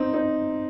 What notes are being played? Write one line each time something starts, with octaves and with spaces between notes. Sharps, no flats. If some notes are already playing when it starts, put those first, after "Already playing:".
Already playing: C4 D#4
C4 D#4